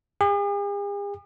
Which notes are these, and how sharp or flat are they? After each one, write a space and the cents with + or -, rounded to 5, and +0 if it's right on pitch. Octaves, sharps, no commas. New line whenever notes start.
G#4 -45